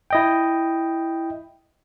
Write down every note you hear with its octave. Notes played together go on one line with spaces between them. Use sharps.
E4 D#5 G5